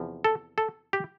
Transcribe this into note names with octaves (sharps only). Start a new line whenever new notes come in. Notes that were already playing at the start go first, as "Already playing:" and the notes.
Already playing: E2 C3 F3
A4
A4
G4